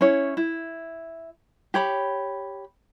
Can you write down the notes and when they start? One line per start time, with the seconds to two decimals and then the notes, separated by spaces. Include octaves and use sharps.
0.01 C#4 E4 C#5
0.37 E4
1.74 G4 C#5 B5